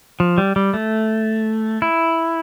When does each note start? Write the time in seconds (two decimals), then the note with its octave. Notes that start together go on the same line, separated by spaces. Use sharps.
0.20 F3
0.38 G3
0.56 G3
0.74 A3
1.82 E4